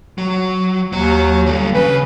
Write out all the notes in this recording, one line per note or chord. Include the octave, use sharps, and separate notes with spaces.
F#3
D#2 F#3 C#5
D3 G3
C#3 B4